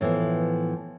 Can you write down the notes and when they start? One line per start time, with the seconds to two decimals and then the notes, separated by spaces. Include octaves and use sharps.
0.01 A2 E3 F3 B3